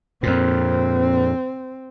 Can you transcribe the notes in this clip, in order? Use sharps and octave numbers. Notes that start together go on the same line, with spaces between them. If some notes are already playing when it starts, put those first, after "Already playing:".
F2 A#2 C4